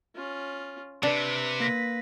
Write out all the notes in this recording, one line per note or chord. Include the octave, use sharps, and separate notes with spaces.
C#4 F4
C3 D4 B4
A#3 A#6 B6